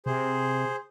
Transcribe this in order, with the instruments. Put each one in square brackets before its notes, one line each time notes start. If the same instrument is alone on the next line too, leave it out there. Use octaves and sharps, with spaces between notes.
[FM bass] C3 [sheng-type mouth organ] G#4 C5